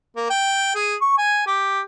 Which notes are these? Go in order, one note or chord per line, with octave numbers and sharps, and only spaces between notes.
A#3
G5
G#4
C#6
G#5
G4